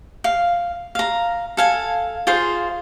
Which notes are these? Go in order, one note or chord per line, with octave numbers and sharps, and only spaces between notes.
F5
F5 A#5
A4 F5 G#5
F4 G#4 C5 F5